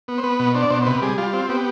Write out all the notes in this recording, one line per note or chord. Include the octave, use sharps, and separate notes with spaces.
B3
C5
B3 B4
B2
D4 C5
D5
B2 C5
C5
C3 B4
G3 G#4
G3 F4
C4
B3 G4